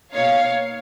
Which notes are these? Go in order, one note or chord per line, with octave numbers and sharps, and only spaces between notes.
B2 A#3 D#4 C#5 F5